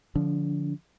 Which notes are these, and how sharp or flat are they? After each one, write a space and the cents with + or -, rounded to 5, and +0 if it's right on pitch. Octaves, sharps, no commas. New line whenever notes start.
D3 +0 F3 +5 D4 -30